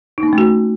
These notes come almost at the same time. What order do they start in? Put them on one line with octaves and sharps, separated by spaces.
D#4 A#3 C#4 A3 F#4